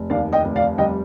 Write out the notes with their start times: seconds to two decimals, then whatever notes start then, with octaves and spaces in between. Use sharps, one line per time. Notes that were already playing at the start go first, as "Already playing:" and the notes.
Already playing: F1
0.10 D#2 D5 F5
0.33 D#5 G5
0.45 F1
0.56 D5 F5
0.78 G3 D#5 G5